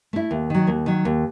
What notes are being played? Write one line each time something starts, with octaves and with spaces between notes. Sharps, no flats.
A3 E4
D#2
D#3 F#3
D#2
D#3 F#3
D#2